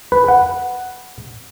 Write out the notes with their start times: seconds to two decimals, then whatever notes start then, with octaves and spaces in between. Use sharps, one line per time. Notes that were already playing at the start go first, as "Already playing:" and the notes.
0.12 B4
0.28 F#5